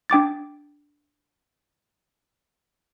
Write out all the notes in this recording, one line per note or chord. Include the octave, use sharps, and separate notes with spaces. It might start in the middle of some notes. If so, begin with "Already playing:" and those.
D4 G5 D6 A6